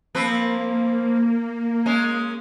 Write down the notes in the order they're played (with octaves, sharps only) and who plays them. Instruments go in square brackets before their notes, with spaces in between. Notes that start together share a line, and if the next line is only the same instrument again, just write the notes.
[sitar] F3 C4 B4 [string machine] A#3
[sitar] G#3 C#4